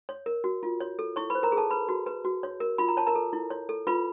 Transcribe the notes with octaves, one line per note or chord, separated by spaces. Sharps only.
C#5
A#4
F#4
F4
C#5
A4
E4 C#5 C#6
B4 C5 B5
A#4 A#5
G#4
A4 A5
B4 B5
F#4
B4
F#4
C#5
A#4
F4 B5
A#5
C#5 A5
A#4 A#5
A4
E4
C#5
A4
F4 B4 B5